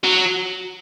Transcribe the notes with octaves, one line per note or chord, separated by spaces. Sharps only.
F#3